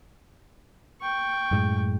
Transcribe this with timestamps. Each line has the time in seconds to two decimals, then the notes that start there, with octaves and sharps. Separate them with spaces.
1.01 G5 C#6
1.51 F#2 A2 G#3